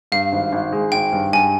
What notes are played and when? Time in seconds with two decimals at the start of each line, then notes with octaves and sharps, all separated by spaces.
0.12 G2 F5
0.32 G#1
0.52 G#1
0.72 G#3
0.92 G#1 G5
1.12 G2
1.33 G2 G#5